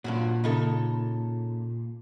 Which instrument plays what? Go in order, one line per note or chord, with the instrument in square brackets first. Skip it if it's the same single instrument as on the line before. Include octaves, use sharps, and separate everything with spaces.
[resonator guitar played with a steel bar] G2 F3 F#3 [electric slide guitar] A#2
[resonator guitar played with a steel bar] C#3 D#4 A4